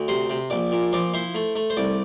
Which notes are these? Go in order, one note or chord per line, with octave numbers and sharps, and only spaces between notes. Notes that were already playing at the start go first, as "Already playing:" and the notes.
Already playing: D2
C3 C5
C3
A#1 D5
A#2
F3 D5
E4 C5
A3
A3
C5
C2 D5